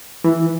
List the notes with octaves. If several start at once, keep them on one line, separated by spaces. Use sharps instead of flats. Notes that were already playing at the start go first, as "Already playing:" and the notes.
E3